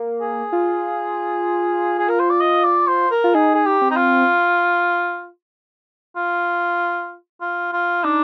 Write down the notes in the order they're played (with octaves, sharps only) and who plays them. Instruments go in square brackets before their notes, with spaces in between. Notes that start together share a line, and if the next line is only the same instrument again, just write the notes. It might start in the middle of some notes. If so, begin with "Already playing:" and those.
Already playing: [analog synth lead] A#3
[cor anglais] G#4
[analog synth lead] F4
[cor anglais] G#4
A#4
C5
D5
D#5
D5
C5
A#4
[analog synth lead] F4
[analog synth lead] D#4 [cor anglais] G#4
[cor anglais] G#4
G4
[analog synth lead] C4
[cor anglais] D#4
F4
F4
F4
F4
[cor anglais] D4 [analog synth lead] D#4